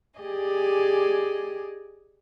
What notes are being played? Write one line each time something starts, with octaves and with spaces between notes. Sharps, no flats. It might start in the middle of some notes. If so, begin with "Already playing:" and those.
G4 G#4 D5 D#5 G#5